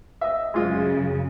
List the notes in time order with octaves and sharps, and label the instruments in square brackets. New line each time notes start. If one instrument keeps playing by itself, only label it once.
[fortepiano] D#5 E5
[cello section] F#2 C#3 [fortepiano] G#3 F4 D#5